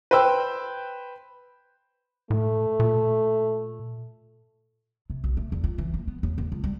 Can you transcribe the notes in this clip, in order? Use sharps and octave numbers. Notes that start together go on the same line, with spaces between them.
B4 C5 G5 E6
A2 A3
A#2
C3
B1
A3
E2
F4
E3
A#3
B3
D#2
D#2
C#2
G3